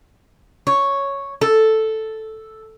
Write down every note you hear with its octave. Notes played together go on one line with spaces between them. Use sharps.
C#5
A4